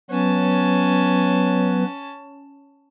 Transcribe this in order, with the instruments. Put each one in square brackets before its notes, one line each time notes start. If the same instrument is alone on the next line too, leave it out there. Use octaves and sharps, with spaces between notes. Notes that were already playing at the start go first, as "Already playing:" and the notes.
[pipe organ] F#3 B3 B4 [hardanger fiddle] C#4 A5